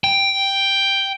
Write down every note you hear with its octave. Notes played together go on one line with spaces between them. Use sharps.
G5